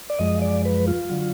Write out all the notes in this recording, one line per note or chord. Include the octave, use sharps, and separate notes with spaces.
D5
F#2 F3 G#3 D#5
D5
B4
F4
D3 F#3